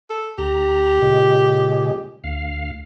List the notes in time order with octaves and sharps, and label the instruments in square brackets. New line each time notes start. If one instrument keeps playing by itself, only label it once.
[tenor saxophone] A4
[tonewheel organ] D2 A#5 [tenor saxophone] G4
[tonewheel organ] A#2 C#3 G#3
D2 F5